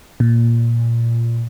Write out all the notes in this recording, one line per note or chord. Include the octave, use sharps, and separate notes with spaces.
A#2